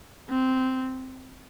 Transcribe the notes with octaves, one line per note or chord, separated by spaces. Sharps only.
C4